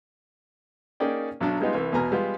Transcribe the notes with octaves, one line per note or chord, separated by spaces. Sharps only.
A#3 C#4 D#4 G#4 D5 G5
B1 F#3 D4
G3 G#3 B3 D#4 F4
C2 E3
E2 B2 B3 G#5 A#5 F6
G3 G#3 B3 F4